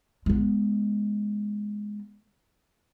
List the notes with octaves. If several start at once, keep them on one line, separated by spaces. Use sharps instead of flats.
G#3 B3